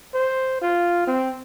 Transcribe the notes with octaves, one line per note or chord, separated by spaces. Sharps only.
C5
F4
C4